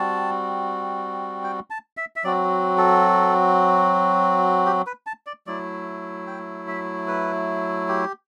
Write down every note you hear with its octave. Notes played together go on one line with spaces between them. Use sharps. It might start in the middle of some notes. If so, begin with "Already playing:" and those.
Already playing: G3 C4 F#4 A5
G5
A5
E5
E5
F#3 C4 F#4 D5
A4
G4
B4
A5
D5
F#3 A3 E4 D5
G5
E5
B4
G4